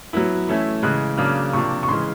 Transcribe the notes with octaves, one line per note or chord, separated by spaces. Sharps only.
F#3 B3 E4
E3 A3 C#4 E4
C#3 E3 G#3 F#6
C#3 F#3 A#3 D4 F6
C3 F3 A#3 D4 C#6
C#6
C#3 E3 G#3 C6